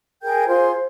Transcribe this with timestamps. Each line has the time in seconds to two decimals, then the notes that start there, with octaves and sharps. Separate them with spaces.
0.23 G#4 A#4 G5 G6
0.47 F4 G#4 C5 C6
0.72 C5